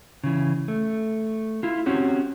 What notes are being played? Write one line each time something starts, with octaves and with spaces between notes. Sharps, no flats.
C#3 E3
A3
E4 F4
C4 C#4 F#4 G4